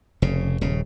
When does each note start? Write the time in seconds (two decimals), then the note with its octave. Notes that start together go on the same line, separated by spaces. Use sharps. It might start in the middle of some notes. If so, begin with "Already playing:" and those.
0.22 F1 C#3
0.61 D#1 C#3